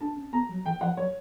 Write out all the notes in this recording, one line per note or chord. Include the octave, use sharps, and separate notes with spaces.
D4 A5
C#4
B3 A#5
F#3
E3 G5
F3 F#5
F#3 C#5